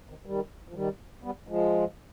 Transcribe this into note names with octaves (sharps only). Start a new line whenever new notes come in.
C3 D#3
D#3 G3
F3
D#3 G3
G3 B3
F3 G#3